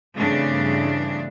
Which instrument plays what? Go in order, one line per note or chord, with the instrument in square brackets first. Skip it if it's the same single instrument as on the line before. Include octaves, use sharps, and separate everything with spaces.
[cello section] G2 C#3 E3 A3 C4 D4